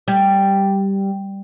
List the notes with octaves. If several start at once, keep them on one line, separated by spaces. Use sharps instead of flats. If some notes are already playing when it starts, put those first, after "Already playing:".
G3